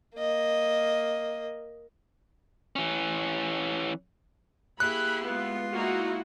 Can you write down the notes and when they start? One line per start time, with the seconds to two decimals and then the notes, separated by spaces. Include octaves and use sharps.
0.16 A#3 D#5
2.76 E3 C#4
4.80 A#3 E4 G4 G#4 B5 F#6
5.24 G#3 B3 F4
5.73 A#3 D#4 E4 F#4